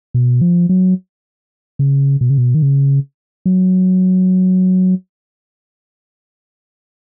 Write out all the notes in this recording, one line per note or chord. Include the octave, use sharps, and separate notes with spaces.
B2
F3
F#3
C#3
B2
C#3
B2
D#3
C#3
F#3